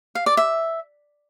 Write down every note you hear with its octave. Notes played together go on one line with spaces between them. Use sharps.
F5
D5
E5